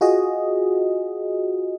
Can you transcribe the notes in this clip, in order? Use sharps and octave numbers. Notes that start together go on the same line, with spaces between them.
F4 F#4 G#4 D#5